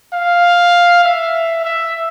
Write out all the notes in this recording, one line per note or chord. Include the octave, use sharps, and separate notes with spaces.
F5
E5
E5